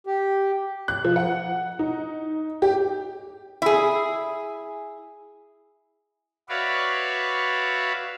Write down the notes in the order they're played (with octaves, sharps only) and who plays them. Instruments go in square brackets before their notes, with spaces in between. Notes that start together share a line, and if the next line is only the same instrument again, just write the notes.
[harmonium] G4
[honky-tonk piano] F#6
F3
F#5
D#4
G4
[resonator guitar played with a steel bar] E4 G#4
[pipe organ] F#4 B4 C#5 D5 E5 F5